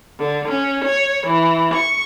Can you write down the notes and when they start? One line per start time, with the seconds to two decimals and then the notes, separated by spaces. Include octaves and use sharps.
0.18 D3
0.48 C#4
0.84 C#5
1.27 E3
1.74 C#6